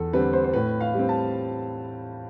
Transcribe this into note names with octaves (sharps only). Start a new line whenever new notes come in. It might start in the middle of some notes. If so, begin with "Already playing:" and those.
Already playing: E2 A4
D3 G3 C4 B4
C5
C5
A2 B4
F5
G3 C4
A5